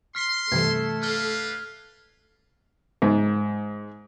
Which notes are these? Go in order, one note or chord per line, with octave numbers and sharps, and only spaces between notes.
C6 F6 B6 C7
G2 C3 E3 A3 A4 G#6
D4 B4 F5 F6 G7
G#2